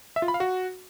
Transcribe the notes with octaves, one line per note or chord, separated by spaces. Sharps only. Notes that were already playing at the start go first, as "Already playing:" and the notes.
E5
F4
B5
F5
F#4